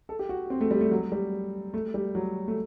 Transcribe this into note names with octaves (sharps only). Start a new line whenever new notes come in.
A4
G4
F#4
C4
A3
G3
A3
F#3
G3
A3
G3
F#3
A3